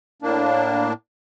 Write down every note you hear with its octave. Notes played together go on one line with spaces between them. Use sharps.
A2 A#3 D4